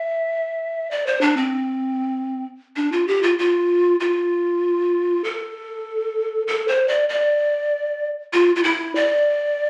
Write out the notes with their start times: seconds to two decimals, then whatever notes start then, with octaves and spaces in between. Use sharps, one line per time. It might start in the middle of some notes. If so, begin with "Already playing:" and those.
Already playing: E5
0.91 D5
1.07 C5
1.21 D4
1.37 C4
2.76 D4
2.92 F4
3.08 G4
3.23 F4
3.39 F4
4.00 F4
5.24 A4
6.48 A4
6.68 C5
6.88 D5
7.09 D5
8.33 F4
8.56 F4
8.63 E4
8.95 D5